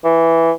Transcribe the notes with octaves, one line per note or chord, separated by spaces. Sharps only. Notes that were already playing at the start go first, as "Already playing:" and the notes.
E3